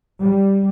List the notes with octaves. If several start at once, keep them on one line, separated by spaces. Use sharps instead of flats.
G3